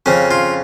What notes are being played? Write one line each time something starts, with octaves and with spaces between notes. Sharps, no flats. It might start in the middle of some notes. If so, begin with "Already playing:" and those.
F2 C#3 C#4
F4